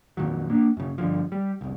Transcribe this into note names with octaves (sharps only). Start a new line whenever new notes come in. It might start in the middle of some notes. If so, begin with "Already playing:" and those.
F2 A#2 D#3 F#3
A#3 D4
F#2 C#3
G2 D3 F3
G3
F1 C2